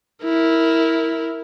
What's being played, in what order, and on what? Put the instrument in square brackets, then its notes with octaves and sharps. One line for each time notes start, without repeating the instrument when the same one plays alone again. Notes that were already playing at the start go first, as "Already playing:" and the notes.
[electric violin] E4 A#4